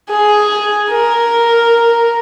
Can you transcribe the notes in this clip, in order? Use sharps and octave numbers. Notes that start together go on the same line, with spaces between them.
G#4
A#4